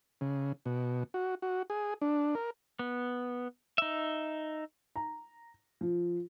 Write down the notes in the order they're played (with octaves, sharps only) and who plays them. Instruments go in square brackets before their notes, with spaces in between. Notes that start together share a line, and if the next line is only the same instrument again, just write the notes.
[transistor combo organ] C#3
B2
F#4
F#4
G#4
D4
A#4
[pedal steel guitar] B3
D#4 E5
[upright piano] A#5
F3